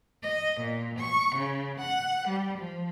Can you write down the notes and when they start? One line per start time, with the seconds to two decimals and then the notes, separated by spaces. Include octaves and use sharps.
0.22 D#5
0.61 A#2
0.99 C#6
1.37 C#3
1.79 F#5
2.28 G3
2.57 F3